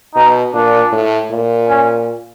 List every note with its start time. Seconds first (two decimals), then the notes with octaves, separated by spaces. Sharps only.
0.15 B2 D#4
0.54 A#2 D4
0.92 A2
1.31 A#2
1.69 C#4